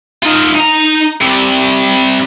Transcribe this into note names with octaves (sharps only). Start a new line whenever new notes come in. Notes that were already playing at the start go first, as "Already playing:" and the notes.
D#4 F4
D#4 A#5
C3 G3